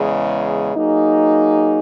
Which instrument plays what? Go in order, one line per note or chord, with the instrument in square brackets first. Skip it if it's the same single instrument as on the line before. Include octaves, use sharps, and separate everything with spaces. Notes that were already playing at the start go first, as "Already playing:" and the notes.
Already playing: [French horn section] E2 C#3 G#3
F#3 A#3 D#4 G#4